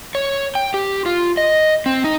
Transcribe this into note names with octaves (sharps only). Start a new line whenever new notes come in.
C#5
G5
G4
F4
D#5
C4
D#4